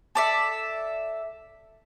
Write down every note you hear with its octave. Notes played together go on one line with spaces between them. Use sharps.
A4 D5 E5